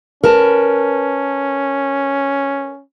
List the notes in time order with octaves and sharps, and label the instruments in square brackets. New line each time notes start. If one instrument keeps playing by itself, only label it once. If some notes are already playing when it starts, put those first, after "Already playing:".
[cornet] C#4 [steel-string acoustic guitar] A#4 B4 A5